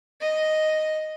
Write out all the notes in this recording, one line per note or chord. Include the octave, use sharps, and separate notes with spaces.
D#5